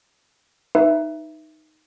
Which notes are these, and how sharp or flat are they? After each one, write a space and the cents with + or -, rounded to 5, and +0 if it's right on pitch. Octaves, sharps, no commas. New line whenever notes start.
D#4 +0 B4 +0 E5 +10